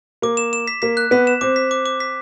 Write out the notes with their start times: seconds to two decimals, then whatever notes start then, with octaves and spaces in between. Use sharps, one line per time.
0.22 A#3 D6
0.37 E7
0.53 E7
0.68 B6
0.82 A#3 B6
0.97 F#6
1.11 B3 B6
1.27 E7
1.41 C4 D6
1.56 B6
1.71 D6
1.86 D6
2.00 B6